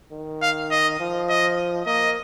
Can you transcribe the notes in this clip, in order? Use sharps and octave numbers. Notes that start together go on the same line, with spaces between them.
D#3
F5
D#5
F3
D#5
A#3 D#5